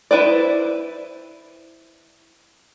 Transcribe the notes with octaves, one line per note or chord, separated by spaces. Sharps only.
E4 B4 C5 D5